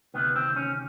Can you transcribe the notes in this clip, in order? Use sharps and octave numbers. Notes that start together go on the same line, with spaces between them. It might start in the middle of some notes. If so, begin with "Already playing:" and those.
D2 C3 D#3 B3
C4
C#4